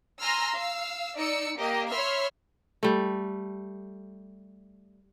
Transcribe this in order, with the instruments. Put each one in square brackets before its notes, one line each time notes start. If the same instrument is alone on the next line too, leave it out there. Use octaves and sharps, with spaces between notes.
[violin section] G#5 A#5 C6 E6 F6
F5 E6
D#4 D5 E6 C#7
A#3 G4 D#5
C#5 E5 B5 C6 E6 F6
[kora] G3 A3